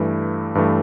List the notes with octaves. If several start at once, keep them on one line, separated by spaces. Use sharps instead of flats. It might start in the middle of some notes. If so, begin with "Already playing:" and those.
Already playing: G2 E3 A3
G2 E3 A3